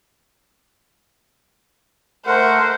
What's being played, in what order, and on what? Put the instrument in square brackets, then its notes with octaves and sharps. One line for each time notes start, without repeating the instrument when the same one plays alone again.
[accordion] A3 A#4 F#5 [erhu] C5